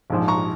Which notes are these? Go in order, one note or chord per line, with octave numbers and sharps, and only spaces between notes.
A#1 G#2 F3
A#5 C#6